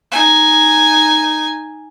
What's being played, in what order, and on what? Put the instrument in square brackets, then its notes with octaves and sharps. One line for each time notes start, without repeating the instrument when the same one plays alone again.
[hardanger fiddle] D#4 G#5